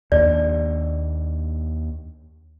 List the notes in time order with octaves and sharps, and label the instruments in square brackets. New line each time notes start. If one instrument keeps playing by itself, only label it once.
[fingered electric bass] D#2 D4 [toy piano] D5